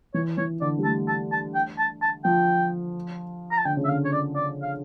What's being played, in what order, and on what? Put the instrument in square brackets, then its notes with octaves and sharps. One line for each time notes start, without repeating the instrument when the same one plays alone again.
[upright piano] E3 [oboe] C#5
[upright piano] E3 [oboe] C#5
[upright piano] D3 [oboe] D5
[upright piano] G3
[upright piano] A3 [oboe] A5
[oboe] A5
A5
G5
A5
A5
[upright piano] F3 [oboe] G5
[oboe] A#5
A5
[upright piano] D3 [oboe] G5
[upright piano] C#3
[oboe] E5
[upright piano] D3 [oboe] F5
[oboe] C#5
D5
D5
F5